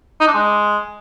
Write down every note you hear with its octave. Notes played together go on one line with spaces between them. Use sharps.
D#4
D4
G#3